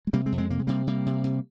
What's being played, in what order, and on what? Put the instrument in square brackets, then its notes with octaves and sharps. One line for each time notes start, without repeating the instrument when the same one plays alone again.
[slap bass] G#3
C3 G3 A#3
G#3 C4
F2
G#3 C4
C3 A#3
G#3
C3 G3 A#3
C3 G3 A#3
C3
C3